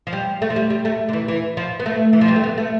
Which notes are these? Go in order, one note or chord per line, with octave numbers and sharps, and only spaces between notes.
F3
G3
A3
F3
G3
G3
A3
D3
E3
E3
F3
B3
A3
E3
F3
G3
A3
B3
A3